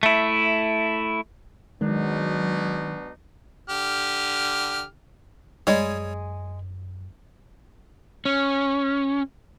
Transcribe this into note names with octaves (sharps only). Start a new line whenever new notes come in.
A3 E4
B2 D#3 F#3 G#3 D4 D#4
D3 G4 F6
F#2 G3 G#3 G#4 C#5
C#4